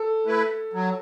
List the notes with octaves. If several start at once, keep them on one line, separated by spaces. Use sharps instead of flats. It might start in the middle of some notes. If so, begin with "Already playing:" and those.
Already playing: A4
A3 E4 B4
F#3